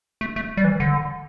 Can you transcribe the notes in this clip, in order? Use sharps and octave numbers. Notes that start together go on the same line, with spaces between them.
A3
A3
G3
E3
D3